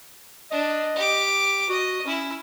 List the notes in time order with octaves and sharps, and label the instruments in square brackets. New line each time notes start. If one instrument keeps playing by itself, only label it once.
[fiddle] D4 [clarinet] D#5
[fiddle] G4 D6
[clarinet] F#4 [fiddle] D#5
[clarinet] C#4 [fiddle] E4